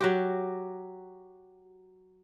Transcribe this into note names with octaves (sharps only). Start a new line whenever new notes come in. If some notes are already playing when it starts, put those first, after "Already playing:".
F#3 F#4 G4